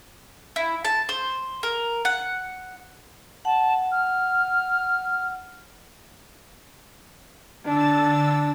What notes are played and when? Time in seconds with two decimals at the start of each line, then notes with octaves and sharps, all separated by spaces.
0.56 E4
0.85 A5
1.09 C5
1.63 A#4
2.05 F#5
3.45 F#5 A5
3.92 F6
7.64 D3 D4 E6 A6